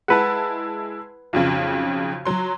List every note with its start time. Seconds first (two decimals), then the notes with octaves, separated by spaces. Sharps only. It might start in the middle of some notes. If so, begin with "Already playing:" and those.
0.08 G#3 E4 B4 F#5 A5
1.33 B1 F2 C#3
2.25 F#3 C6